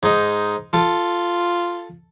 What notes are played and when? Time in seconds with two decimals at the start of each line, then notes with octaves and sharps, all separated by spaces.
0.03 G#2 D#4
0.73 F4 A4